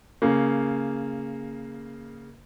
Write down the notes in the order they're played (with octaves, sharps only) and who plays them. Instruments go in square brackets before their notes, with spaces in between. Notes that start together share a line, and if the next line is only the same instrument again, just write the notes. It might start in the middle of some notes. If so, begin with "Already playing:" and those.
[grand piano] C#3 A#3